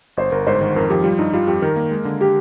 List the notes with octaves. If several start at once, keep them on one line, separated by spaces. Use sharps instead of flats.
G1 C5
G1 A#4
G#2 C5
D#3
F2 A#4
F3 G4
G3 F4
G2 D#4
G3 F4
F2 G4
D#3 A#4
A#3
G#3
D3
G4